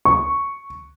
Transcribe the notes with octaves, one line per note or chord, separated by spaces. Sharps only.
C#6